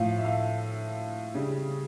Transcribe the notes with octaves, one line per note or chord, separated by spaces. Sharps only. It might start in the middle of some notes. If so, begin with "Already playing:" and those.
Already playing: A2 F3 F5
E5
F5
C#3 G3